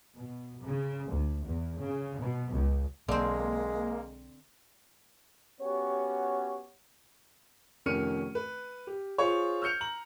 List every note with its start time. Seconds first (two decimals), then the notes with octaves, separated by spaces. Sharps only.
0.15 B2
0.63 C#3
1.10 D2
1.45 E2
1.81 C#3
2.18 B2
2.51 C#2
3.08 B1 D3 G#3 A#3 C4
5.61 B3 C#4 F#4 G4 C#5
7.86 F1 D#3 C#4 F6 C#7 D#7
8.35 B4
8.87 G4
9.18 F4 G#4 C5 C#5
9.62 E6 F6 G6 C#7 F7
9.81 A#5 F#7